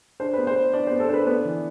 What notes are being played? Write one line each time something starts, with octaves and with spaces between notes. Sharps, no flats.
D4 C5
B3 B4
C5
B3
D4 D5
C5
B3
A4
D4 B4 C5
B3 B4
E3